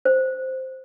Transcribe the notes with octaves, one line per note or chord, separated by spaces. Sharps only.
C5